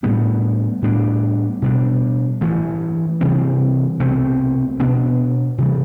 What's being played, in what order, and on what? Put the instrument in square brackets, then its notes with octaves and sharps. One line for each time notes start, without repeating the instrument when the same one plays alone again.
[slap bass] A2 G3 B3 D4
A2 G3 B3 D4
B2 G3 D4
G2 E3 A3
C3 E3 G3 C4
C2 B2 A3 C4
B2 B3 D4
C3 E3 G3